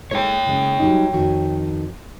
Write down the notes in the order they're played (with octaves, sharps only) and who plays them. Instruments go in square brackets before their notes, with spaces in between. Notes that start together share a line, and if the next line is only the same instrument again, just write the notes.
[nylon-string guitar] G#3 E4 A4 [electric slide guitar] C#5 G5
[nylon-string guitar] C#3 G#3
F#3 G3 D#4
F2 D#3 F#4